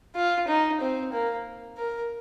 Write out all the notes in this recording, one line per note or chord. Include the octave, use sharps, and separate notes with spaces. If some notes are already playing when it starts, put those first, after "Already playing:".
F4
D#4
C4
A#3
A#4